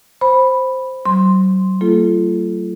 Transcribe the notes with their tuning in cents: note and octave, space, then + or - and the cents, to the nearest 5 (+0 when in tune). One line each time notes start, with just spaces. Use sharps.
C5 +0 B5 +0
F#3 +35 C6 +5
A3 +45 F4 -30 A4 -30